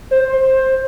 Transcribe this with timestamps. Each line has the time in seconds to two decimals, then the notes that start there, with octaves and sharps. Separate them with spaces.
0.11 C5
0.28 C5